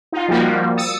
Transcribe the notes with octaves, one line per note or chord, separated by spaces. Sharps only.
D#4 F4
F3 G3 A#3 F#4
D#6 E6 A6 C#7